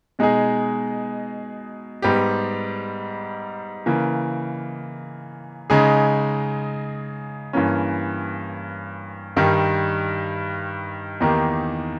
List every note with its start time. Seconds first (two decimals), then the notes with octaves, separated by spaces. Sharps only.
0.19 B2 G#3 D#4 G#4
2.02 G#2 G3 B3 G4
3.86 C#3 E3 A#3
5.70 C#3 G#3 D#4 G#4
7.53 G2 E3 A#3 C#4
9.37 G2 D#3 G3
11.20 E2 D#3 A#3 D#4 G4